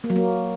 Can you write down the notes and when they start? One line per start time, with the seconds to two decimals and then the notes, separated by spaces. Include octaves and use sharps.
0.04 A#3
0.10 F#3
0.16 A#3